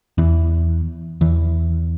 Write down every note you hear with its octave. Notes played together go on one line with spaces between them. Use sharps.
E2 E3
E2 E3